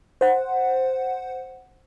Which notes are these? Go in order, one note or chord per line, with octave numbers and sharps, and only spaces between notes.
C5 F#5